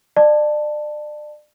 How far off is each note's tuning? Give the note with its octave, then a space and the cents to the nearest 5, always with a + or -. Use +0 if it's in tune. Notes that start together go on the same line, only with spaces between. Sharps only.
D5 +35 A5 +0